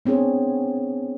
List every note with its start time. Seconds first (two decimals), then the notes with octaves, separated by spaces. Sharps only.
0.06 B3 C4 D4 G#4 C#5